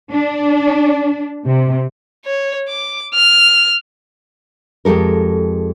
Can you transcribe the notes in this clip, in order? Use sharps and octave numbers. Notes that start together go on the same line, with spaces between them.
D4
C3
C#5
D6
F6
F2 G#3 G4 A4 A#4